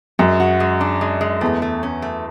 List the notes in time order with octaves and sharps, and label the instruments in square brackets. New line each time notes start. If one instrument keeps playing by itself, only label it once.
[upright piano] F#2 [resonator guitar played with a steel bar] G#3
[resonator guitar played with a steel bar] F#4
G#3
D4
G#3
G#3
[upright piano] E2 [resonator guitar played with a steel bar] A3
[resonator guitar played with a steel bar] A3
C#4
A3